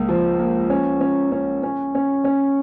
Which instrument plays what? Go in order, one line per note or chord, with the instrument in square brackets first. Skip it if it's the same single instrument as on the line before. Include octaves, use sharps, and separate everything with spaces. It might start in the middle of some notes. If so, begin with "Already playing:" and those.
Already playing: [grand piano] C#2 A#3
F3
A#3
C#4
C#4
C#4
C#4
C#4
C#4